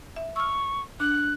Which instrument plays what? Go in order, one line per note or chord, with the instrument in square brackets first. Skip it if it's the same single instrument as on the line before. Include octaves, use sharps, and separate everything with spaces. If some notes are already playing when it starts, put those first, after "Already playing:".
[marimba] E5
[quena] C#6 [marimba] E6 F6
[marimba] D4 [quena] F#6